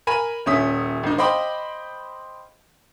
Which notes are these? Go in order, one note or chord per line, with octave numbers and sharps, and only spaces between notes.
A#4 G#5 B5 D#7
D#1 C#4 E5 D#6 B6
G#1 D#4
C5 D#5 F5 G5 B5 D6